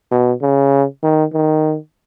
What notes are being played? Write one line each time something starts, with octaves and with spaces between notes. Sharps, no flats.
B2
C#3
D#3
D#3